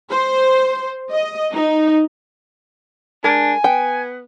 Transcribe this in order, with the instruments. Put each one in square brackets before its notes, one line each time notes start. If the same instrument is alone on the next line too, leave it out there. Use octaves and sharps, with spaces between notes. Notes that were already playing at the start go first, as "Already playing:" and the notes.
[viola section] C5
D#5
D#4
[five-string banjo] G#3 A#4 [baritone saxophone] D4 [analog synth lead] G#5
[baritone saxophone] B3 [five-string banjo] G5